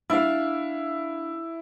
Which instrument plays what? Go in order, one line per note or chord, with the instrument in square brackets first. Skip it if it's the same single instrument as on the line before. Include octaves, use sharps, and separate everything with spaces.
[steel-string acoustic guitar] D4 F5 [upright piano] E4